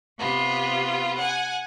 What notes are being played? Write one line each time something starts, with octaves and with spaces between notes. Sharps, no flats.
C3 B3 F4
F#5 G#5